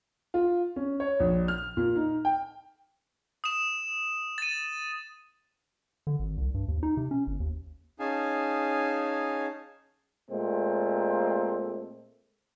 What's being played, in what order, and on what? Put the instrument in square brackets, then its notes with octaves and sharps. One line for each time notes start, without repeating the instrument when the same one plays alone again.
[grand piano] F4
C#4
C#5
A#1
F6
A#2
D#4
G5
[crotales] D#6 E7
A6 D#7
[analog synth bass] D3
G#1
C2
G2
D#2
D#4
C3
C#4
G1
D#2
[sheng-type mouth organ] C#4 D#4 G#4 F5 G#5 A5
[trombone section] A#2 G#3 A3 C4